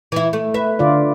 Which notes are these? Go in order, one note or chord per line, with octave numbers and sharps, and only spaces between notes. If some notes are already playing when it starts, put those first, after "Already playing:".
E3 E4
A3
B4 E5
D3 F4 D5